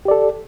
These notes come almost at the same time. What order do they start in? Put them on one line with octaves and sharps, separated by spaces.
G4 D5 A4